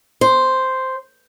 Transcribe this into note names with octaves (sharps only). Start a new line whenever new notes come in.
C5